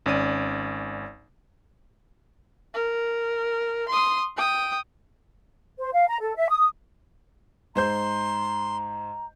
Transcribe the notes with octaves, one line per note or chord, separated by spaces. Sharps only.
G#1 C#4 D5 D#7
A#4
C6 D#6
G5 D#6
C5
F5
A#5
A4
E5
D#6
G#2 C5 A#5 C6 G6